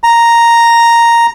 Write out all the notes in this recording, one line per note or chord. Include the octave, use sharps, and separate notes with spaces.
A#5